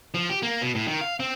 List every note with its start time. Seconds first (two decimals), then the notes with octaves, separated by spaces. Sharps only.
0.14 F3
0.29 G4
0.43 A#3
0.62 B2
0.75 A2
0.88 D#3
1.01 F5
1.20 C4